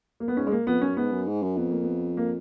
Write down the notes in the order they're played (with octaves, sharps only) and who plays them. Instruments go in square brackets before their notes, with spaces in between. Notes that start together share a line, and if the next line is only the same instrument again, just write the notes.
[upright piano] A#3
B3
[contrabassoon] G#2 [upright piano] C#4
[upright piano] G#3
A#3
[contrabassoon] F2 [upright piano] B3
[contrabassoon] F#2 [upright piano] C#4
[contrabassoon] G#2 [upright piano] B3
[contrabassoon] F#2
G#2
F#2
[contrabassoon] F2 [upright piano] B3
[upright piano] A#3
B3
A#3